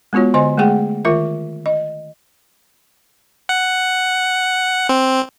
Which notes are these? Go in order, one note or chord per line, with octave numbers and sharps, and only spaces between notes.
G#3 B3 F4 F#4 C#5
D3 C5 D#5 G#5 C6
G#3 A3 G#4 F#5 G5
D#3 F4 A#4 E5
D#5
F#5
C4